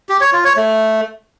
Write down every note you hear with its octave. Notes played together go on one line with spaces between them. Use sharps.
G4
C#5
F4
C#5
A3